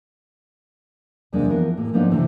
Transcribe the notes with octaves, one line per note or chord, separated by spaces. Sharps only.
E2 C3 G#3 A#3 D4
E3 F3 B3 A#4
A2 G#3 A#3
G#2 F3 A#3 B3 D4 D#4
C3 E3 A3